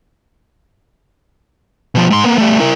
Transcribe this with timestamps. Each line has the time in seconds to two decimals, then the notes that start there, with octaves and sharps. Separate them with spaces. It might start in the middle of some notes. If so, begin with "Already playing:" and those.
1.95 B2 F3
2.11 G#2 C6
2.24 A#3 B3
2.38 G3 A3
2.60 E4 A#4